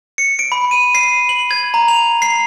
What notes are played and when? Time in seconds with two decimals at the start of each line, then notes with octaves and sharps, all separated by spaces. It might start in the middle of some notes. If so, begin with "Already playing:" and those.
0.18 C#7
0.39 D7
0.52 B5
0.71 D#7
0.95 C7
1.29 F#7
1.51 G#6
1.74 A#5
1.88 F7
2.22 C7